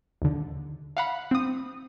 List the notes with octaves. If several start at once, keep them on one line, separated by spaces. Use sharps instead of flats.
D#2 D3
F5 F#5 B5
C4 D#6